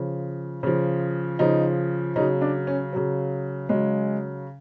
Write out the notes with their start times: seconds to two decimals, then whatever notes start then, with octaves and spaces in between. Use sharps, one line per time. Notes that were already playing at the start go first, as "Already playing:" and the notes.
Already playing: C#3 F3
0.63 C#3 F3
1.39 C#3 F3 D#4
2.16 C#3 D#4
2.19 F#3
2.41 D4
2.67 C#4
2.93 C#3 F#3
3.69 C#3 F#3 G#3